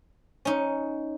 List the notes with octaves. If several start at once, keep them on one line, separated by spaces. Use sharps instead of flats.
C#4 D#4